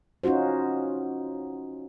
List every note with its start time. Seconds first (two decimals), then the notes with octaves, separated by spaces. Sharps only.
0.24 C#4 D#4 F4 F#4 C5